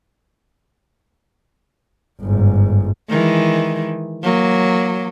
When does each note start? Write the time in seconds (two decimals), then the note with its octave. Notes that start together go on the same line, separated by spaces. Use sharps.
2.21 G1 G#2
3.10 D#3 E3 G#3
4.23 F#3 A#3